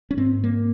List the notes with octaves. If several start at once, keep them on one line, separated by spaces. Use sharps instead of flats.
C#4
G#2 C4
A#3